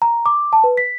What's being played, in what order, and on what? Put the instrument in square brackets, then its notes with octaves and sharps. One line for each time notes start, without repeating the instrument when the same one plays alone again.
[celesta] A#5
D6
A5
B4
B6